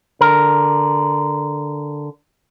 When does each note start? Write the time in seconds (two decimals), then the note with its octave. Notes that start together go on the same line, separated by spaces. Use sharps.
0.21 D3 A#4